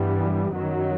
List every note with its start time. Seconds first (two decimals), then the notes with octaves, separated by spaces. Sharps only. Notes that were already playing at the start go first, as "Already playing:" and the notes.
Already playing: G2 E3 G3 B3
0.53 F#2 D#3 F#3